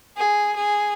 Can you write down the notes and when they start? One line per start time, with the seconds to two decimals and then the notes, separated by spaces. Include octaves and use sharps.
0.17 G#4
0.55 G#4